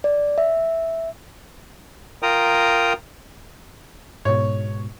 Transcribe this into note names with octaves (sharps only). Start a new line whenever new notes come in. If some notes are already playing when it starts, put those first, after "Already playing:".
D5
E5
F4 A#4 G5 A#5 D#6
G#2 B2 C#5